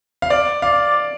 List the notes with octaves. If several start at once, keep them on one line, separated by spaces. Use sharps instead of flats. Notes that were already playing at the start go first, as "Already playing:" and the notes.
F5
D5
D5 F5